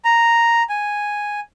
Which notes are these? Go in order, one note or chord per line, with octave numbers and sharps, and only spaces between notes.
A#5
G#5